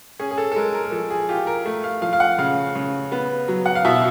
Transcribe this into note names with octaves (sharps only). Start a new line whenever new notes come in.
C#4 G#4
G#4
A4
A4
G#3 A#4
A#4
A#4
F3 A4
G#4
F4 G4
A#4
A3
F5
F3 F5
F5
F#5
C#3 F5
C#3
B3
F#3
F#5
F5
B2 E5